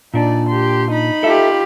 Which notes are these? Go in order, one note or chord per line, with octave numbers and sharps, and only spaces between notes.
A#2 D4 D#4 D5
G4 C6
D#4 B5
F4 G4 A4 E5